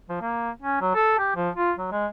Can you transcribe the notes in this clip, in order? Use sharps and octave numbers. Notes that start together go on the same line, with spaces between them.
F3
A#3
C#4
F#3
A4
G4
F3
F4
F#3
G#3